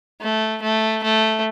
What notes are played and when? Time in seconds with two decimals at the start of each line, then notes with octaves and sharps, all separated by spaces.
0.21 A3
0.62 A3
1.03 A3